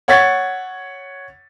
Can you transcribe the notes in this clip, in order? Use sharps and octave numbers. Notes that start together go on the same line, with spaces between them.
C#5 F#5 C#6 G#6 A6 B6